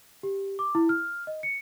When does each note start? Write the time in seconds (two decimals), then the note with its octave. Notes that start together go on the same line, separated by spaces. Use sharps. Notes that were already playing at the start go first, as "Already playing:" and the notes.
0.23 G4
0.59 D6
0.75 E4
0.89 F6
1.27 D#5
1.43 C#7